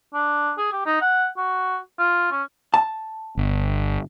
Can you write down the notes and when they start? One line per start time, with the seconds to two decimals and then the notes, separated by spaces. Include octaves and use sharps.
0.14 D4
0.58 G#4
0.72 G4
0.86 D#4
1.02 F#5
1.37 F#4
1.98 F4
2.31 C#4
2.74 A5
3.37 G1